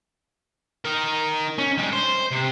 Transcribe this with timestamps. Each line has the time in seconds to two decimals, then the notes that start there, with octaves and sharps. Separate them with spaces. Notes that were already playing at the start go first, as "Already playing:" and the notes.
0.85 D#4 A#4
1.58 C#4
1.78 G3 G#3
1.93 C5
2.31 C3